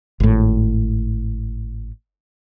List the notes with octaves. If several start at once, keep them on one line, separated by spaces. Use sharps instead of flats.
G#1 A2